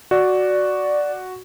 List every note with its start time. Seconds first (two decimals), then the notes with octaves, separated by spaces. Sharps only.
0.11 F#4 D5